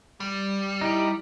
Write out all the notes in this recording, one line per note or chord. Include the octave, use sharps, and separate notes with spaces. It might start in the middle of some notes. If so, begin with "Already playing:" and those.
G3
D#4 E4 G4